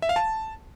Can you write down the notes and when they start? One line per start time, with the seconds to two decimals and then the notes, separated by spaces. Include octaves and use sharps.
0.02 E5
0.09 F5
0.16 A5